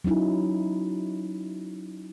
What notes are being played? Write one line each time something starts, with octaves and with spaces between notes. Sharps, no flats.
F#3 C#4 D#4 E4